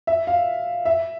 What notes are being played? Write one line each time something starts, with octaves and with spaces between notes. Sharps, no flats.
E5
F5
E5